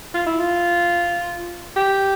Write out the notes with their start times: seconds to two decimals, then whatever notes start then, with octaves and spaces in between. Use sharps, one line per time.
0.15 F4
0.27 E4
0.40 F4
1.76 G4